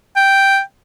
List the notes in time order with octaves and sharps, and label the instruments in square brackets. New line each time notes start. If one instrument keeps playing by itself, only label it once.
[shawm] G5